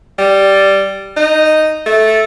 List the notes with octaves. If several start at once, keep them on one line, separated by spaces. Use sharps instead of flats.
G3
D#4
A3